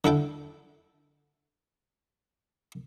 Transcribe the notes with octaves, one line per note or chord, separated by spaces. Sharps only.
D3 E4 A4 G5